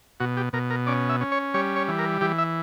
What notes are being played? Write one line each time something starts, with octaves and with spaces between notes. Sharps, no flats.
B2 F#4
G4
B2 A#4
A#4
C#4 D5
E5
C#4
C#5
G3 C#5
C#5
E3
A#4
E3 G4
E5